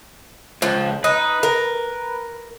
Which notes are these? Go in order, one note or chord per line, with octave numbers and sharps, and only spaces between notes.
C#2 F3
D#4 B4
A#4